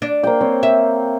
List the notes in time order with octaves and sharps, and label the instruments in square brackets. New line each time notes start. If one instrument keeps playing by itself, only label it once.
[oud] D4
[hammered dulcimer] A#3 C5 G5
C4 C#5
[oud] E5